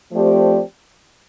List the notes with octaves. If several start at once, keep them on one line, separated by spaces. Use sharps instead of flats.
F3 A3 C4 G4 D5